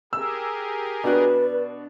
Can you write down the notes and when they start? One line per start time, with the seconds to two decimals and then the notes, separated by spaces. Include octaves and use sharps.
0.13 G4 G#4 A#4 E6
1.04 B2 D4 F#4 B4 F#6